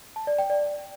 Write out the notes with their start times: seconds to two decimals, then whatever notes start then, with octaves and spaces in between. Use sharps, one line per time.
0.16 A5
0.27 D5
0.39 G5
0.50 D5